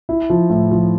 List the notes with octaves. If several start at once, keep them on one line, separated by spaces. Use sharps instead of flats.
E4
F3
A2
F3